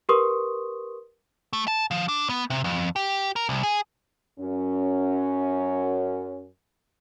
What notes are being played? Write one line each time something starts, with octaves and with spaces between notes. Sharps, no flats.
G4 A#4 B4 C6 C#6 D#6
A3
A5
F3
D4
B3
C3
F2
G4
A#4
C2
G#4
F#2 C#4